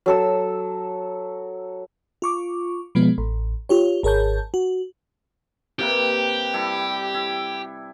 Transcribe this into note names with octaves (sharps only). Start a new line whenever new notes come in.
F#3 A4 E6
F4 C#6 D6
B2 F3 G#3 B3
A1
F4 G4 C#5
G#1 G#4 A#4 C#5 A5 G6
F#4
C3 A#3 G4 B4
G3 E4 A4
E4